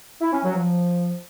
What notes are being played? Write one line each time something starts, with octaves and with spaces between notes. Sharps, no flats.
E4
C#4
F#3
F3